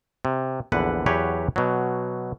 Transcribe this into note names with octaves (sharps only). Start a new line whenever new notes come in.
C3
A#1 E2 D3 B4 F#5
E2 F#3 G4 B4 C#5
B2 F#3